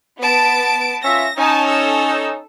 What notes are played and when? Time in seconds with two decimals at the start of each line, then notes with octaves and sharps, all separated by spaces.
0.20 B3 A5 D7
1.05 C#4 F4 E5 A#6
1.38 C#4 D#4 G#5 A5
1.69 A4 E6